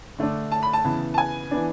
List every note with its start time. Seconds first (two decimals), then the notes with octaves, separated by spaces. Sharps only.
0.19 D3 A3 D4
0.52 A5
0.63 B5
0.73 A5
0.84 C#3 E3 B3
1.14 A5
1.18 G#5
1.51 E3 B3 D4